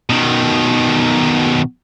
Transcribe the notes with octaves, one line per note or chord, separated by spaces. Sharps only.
B2 D#3